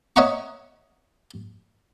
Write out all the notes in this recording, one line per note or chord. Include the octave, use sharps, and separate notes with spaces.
C#5 D#5 E5 F#5 A#5 C#6